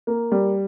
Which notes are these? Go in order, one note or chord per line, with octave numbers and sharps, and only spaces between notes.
A#3
G3